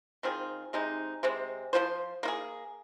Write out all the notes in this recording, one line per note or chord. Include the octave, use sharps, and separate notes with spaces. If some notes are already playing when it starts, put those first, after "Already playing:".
D#3 C4 F4 G#4
C3 G#3 C4 D#4
C3 G#3 C4
F3 G#3 F4 C5
A#3 F4 G#4